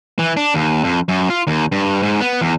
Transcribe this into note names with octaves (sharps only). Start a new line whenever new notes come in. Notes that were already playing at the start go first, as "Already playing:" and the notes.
E3
D4
D#2
F2
F#2
F4
D#2
G2
G#2
B3
E2